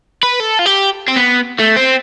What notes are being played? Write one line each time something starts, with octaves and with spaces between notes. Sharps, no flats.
B4
A4
F4
G4
C4
B3
A3
C4